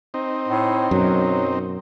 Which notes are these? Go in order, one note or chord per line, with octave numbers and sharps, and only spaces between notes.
C4 D#4
A2
F#2 B2 F#3